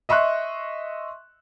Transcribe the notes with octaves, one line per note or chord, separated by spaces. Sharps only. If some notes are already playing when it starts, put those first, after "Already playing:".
D#5 E5 C6 C#6 F#6